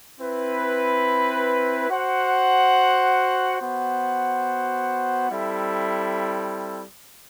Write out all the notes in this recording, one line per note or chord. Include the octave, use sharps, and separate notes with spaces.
C4 E4 B4
F#4 C5 F#5
B3 F#4 C5 F#5
G3 C4 E4 A4 E5